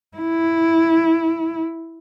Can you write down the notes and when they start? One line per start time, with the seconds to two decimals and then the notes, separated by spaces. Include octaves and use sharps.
0.17 E4